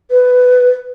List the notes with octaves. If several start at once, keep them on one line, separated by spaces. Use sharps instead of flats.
B4